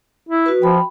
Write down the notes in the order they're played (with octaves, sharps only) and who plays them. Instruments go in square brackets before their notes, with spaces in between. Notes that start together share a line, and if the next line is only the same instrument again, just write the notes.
[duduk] E4
[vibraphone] F#4 B4
[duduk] F3 [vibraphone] G5 B5